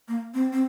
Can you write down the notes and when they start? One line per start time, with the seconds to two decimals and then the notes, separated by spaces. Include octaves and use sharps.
0.08 A#3
0.34 C4
0.52 C4